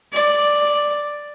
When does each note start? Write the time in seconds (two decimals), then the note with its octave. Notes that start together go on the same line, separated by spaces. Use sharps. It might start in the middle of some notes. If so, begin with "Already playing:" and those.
0.13 D5